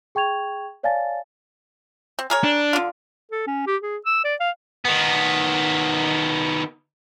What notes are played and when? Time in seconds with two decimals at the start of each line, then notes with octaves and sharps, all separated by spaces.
0.15 G#4 G5 C#6 G#6 F7
0.83 C#5 D5 F5 G#5 A5 A6
2.19 C4
2.30 G#4 A#4 C#5
2.44 D4
2.73 D3 F4
3.31 A4
3.47 C#4
3.67 G4
3.81 G#4
4.06 E6
4.24 D5
4.40 F5
4.85 D#3 B3